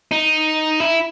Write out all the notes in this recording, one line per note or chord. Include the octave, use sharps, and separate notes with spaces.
D#4
E4